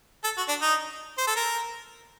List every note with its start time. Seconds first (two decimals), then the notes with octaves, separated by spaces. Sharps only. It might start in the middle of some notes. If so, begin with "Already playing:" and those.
0.24 A4
0.37 F#4
0.49 D4
0.62 D#4
1.18 C5
1.27 A4
1.36 A#4